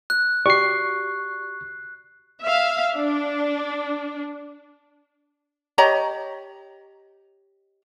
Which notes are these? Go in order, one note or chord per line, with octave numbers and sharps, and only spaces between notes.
F#6
F#4 G4 D5 C#6 C7
E5 F5
D4
G4 C#5 D#5 A#5